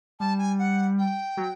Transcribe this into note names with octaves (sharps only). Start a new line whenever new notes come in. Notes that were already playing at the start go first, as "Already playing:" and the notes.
G3 A5
G#5
F#5
G5
F#3